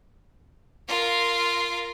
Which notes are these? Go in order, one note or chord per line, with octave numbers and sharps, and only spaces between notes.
F4 A#4